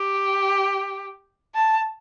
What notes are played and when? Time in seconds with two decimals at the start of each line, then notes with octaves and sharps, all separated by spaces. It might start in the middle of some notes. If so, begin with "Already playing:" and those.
Already playing: G4
1.55 A5